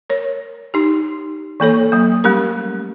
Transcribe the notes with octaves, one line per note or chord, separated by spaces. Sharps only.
A#4 C#5
D#4 G4
E3 A#3 A4 C#5
F#3 A#3
G3 A3 C#4 G4 A#4